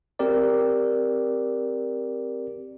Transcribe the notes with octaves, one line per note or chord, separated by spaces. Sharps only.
C4 G4 A#4 D5